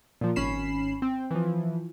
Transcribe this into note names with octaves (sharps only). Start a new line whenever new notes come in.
A#2 F3
G#1 C#4 B5 C7 E7
C4
E3 F3